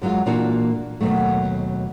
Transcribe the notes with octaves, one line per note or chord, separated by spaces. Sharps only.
F#2 F#3 G#3 F4
A#2 E3 A#3 D4 F4 F#4
D#2 B2 F#3 A3